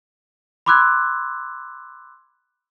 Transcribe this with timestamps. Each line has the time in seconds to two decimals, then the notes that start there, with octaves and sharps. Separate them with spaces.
0.66 B5 C6 D6 E6 F#6 G#6